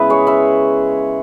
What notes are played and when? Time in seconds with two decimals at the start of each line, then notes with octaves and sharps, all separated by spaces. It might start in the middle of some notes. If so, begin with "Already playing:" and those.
Already playing: C#3 G#3 B3 E4 B4 E5
0.10 G#4 C#5
0.27 B4 E5